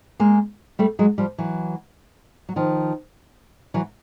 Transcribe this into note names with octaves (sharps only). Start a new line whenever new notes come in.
G#3 A#3
G3 A3
F#3 G#3
F3 G3
E3 F#3
F#3
D#3 F3
E3 F#3